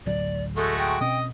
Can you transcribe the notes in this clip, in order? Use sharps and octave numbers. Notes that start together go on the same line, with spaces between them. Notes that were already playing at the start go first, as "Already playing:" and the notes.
A1 D2 F#3 D5
G#3 A3 F#4 A4
G5
B2 C4 C#4 D#5